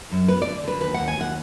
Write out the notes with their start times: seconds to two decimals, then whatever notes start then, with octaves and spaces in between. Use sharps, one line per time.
0.11 F#2
0.28 B3 B4
0.42 D3 D5
0.64 D3 B4
0.81 D#2 B4
0.94 D#2 F#5
1.08 G#5
1.16 D#2 F#5